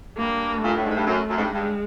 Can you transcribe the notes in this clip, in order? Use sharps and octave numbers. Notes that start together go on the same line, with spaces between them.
G2 A#3
A#2 A3
A2
G#2
G2
F#2
F#2
G#2
G2
G2 G#3